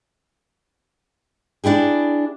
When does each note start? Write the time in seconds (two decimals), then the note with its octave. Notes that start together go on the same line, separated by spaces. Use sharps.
1.64 D4 E4 G4 G#4